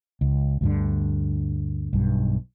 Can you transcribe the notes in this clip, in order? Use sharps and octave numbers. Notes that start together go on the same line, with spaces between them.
C#2
D2 G2 D3
B1 G2